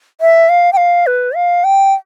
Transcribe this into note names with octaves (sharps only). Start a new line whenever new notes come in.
E5
F5
G5
F5
B4
F5
G5